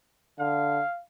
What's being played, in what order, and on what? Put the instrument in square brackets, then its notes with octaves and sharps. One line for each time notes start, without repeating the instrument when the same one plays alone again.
[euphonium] D3 [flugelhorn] F5